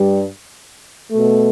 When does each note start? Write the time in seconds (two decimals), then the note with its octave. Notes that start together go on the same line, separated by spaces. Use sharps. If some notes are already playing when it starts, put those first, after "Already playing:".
Already playing: G2 G3
1.11 B2 A3